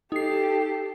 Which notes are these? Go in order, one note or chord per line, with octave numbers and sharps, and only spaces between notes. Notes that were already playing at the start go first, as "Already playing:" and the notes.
D#4 G4 A4 C7